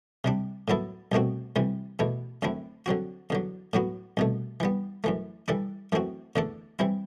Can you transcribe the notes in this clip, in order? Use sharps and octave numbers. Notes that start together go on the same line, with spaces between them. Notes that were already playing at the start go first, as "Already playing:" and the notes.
C3 G3 D4
A2 F#3 B3 E4 A4
C2 B2 A3 C4 F#4
D2 C3 E3 G3
E2 B2 A3 E4
F#2 D3 A3 C4 E4
D3 F#3 C4 F#4
E2 D3 F#3
A2 F#3 B3 F#4
C2 B2 A3
E3 G3 B3
F#2 E3 A3
E3 G3 D4 A4
F#2 E3 A3 C4 F#4
E2 D3 A3 D4 A4
E3 G3 C4 E4